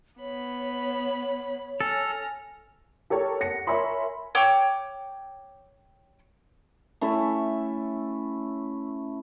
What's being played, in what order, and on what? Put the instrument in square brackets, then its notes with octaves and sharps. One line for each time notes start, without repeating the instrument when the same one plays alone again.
[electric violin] B3 B5 [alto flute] C#5
[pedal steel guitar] A4 [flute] G#5 [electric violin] F6 A#6
[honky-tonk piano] G4 A4 A#4 C#5
F#5 A#6 C#7
A#4 C#5 E5 G#5 B5 C6
[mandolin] C#5 G5 D6 E6
[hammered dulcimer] A3 C#4 E4 E5